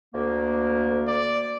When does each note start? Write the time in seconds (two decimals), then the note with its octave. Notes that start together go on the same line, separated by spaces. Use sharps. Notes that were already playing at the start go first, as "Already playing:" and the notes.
0.14 D2 A#3
1.08 D5